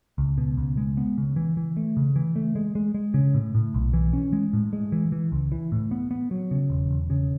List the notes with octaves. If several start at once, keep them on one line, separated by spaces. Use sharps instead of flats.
C#2
B2
C#2
G#3
B3
C#3
E3
E3
A3
C#3
E3
A3
G#3
G#3
G#3
C#3
A2
A2
B1
E3
C#4
G#3
A2
G#3
E3
E3
C#2
E3
A2
B3
B3
F#3
C#3
E1
E1
C#3